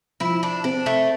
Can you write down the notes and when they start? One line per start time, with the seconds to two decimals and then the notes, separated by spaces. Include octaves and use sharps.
0.20 F3 E4
0.43 D4
0.64 C4 D4
0.86 A3